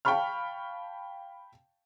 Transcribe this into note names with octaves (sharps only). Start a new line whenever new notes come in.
F5 G5 A5 B5 C#6 F6